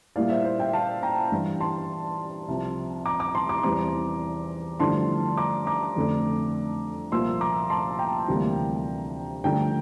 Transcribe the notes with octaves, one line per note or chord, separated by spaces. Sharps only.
A#2 G3 A#3 E4 D5 F5
C5 E5
C5 E5
E5 G5
F5 A5
G5 A#5
G2 E3 G3
A5 C6
C2 C3 F3
A#5 D6
A#5 D6
A5 C6
A#5 D6
E2 E3 G3 C4 A#5 D6
G2 D3 F3 A3 E4 A5 C6
A#5 D6
A#5 D6
F2 D3 A3 D4
C2 A#2 F3 A#3 F4 C6 E6
A#5 D6
A5 C6
G5 A#5
D2 C3 E3 G3 A#3
G2 D3 F3 A3 G5 A#5